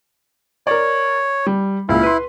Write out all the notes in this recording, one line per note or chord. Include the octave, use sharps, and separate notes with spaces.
A#4 C#5 D5
G3
C#2 A#2 E4
B4 C6